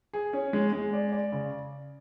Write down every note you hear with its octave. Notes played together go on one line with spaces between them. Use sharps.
G#4
C#4
G#3
G#3
D5
D5
C#3